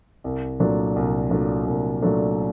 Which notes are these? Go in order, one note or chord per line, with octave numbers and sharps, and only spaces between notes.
C2
A#2 F#3 A3 D4
C2
A#2 F#3 A3 D4
C2
A#2 F#3 A3 D4